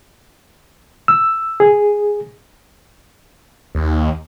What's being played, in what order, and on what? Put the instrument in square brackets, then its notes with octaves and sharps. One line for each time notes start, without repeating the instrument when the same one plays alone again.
[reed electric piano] E6
G#4
[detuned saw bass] D#2